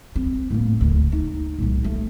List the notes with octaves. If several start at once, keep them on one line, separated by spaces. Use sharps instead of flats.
C4
A2 A#3
D1 D2
D#4
C2 A#2
A3